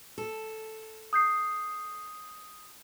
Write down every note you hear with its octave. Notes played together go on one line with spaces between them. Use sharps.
A4
D#6 G6 C7